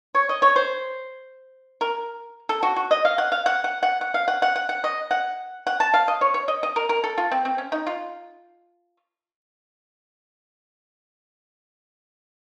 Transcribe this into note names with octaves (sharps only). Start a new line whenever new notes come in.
C#5
D#5
C#5
C5
A#4
A4
F#4
F#4
D#5
F5
F#5
F5
F#5
F#5
F#5
F#5
F5
F#5
F#5
F#5
F#5
D#5
F#5
F#5
A5
F5
D#5
C#5
C#5
D#5
D#5
A#4
A#4
A4
F4
C4
C4
C#4
D#4
F4